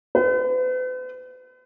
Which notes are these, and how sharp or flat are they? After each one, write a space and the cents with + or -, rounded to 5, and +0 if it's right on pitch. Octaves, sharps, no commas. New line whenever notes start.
B4 +45